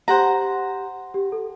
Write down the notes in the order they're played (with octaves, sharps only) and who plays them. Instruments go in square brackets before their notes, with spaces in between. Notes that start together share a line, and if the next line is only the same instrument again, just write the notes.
[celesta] G4 [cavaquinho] C5 F#5 A#5
[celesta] G4
A4